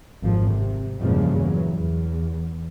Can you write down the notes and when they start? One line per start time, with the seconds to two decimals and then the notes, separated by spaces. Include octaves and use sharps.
0.22 G#1 F2 F3
0.52 C3
1.01 E2 G2 A#2 C#3 F3 G#3
1.34 E2 F#3
1.74 E2